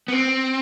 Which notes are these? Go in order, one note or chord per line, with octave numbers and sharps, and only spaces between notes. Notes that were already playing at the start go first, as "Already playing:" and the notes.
B3
C4